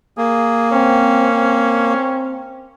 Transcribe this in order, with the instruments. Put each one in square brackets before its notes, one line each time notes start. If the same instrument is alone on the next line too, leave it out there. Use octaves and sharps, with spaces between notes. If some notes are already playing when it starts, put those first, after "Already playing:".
[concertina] A#3 [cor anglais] G#4
[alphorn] C4 [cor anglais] C#4
[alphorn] C4